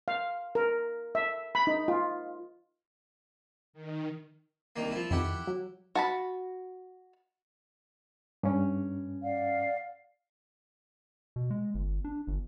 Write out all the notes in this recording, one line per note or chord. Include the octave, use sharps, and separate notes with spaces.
F5
A#4
E5
B5
D#4
F4
D#3
C2 D#3 A#3
F3 E4
F2 D#3 E4 G4 F#5
F#3
F#4 A5 B5
G2 C#4
D5 F5 F#5
B2
G#3
G1
D4
G1